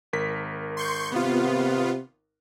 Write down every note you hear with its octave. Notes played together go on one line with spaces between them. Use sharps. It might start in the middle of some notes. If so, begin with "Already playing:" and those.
G#1 A#4 B6
C6 C#6 G6
C3 B3 F4